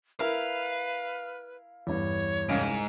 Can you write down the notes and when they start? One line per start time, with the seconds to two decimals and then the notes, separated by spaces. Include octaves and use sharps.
0.20 E4 A#4 B4 F5
1.87 E2 G2 C#5
2.49 C2 G#2 C#4 F5